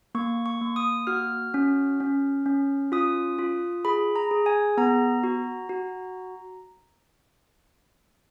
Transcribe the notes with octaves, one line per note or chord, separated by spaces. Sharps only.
A#3 C#6
C#6
A#3
D#6
F#4 F6
C#4
C#4
C#4
F4 D#6
F4
G#4 B5
A#5
G#4
G#5
B3 A#5
F#4
F#4